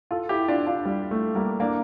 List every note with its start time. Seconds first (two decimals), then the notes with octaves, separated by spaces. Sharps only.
0.11 F4 A4
0.29 E4 G4
0.48 D4 F4
0.67 D4 F4
0.85 G3
1.11 A3
1.35 G3 A#3
1.60 A#3 D4